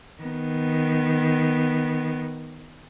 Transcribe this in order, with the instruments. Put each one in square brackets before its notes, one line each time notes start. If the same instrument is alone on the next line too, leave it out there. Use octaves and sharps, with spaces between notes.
[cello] D#3 B3